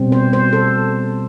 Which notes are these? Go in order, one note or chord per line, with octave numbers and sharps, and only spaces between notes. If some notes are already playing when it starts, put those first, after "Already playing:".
Already playing: B2 G3 C4
C5
C5
A4